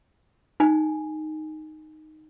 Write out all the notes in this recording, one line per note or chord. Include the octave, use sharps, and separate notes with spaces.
D#4 G#5